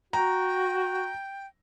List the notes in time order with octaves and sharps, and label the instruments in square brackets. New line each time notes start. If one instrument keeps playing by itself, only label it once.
[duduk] F#4 [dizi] G5 [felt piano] A#5